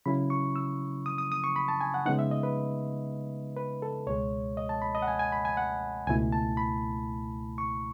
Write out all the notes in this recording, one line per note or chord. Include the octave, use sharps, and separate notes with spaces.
C#3 F#3 C#4 E4 B5
C#6
E6
D#6
D#6
D#6
C#6
B5
A5
G#5
F#5
C#3 G#3 B3 D#4 F#5
E5
D#5
B4
B4
A4
C#2 B2 G#3 C#5
D#5
A5
B5
D#5
F#5
G#5
G#5
B5
G#5
F#5
C#2 B2 A3 E4 G#5
A5
B5
C#6